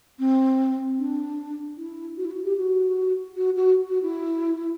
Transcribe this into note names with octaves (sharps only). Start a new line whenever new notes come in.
C4
D4
E4
F#4
E4
F#4
G4
F#4
F#4
F#4
F#4
E4